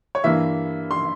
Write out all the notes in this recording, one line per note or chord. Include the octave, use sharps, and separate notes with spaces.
C#5
G2 E3 A#3 E5
C6